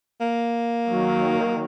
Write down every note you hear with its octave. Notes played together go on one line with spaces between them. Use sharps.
A#3
D#3 F#3